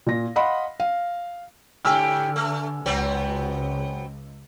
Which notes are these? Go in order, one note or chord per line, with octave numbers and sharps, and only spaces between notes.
A#2 A#6
D#5 F5 F#5 B5 C6
F5
G#2 D3 G4 G#5 E6 F6
A3
C#2 F#3 B3 C4